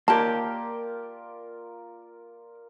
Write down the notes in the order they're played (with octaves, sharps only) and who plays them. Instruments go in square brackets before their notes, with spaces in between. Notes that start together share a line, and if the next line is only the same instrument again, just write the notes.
[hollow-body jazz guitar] A#3 G4 [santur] F4 A#4 D5 [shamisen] A5